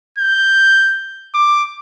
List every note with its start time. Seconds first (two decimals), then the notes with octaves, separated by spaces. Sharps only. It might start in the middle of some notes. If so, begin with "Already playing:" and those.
0.19 G6
1.34 D6